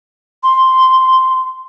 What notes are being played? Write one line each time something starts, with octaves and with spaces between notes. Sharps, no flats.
C6